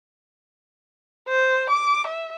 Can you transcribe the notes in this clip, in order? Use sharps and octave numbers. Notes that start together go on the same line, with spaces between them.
C5
D6
E5